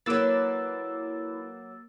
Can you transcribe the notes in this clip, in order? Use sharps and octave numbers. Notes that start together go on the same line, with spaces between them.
F#3 A#3 E4 B4 D6 E6 A6